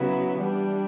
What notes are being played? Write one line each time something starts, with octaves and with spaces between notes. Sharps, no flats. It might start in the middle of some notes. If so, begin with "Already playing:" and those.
Already playing: C#3 F#3 B3 E4
E3 G3 D4